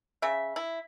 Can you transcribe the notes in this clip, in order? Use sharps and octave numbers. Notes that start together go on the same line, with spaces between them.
C#3 E5
E4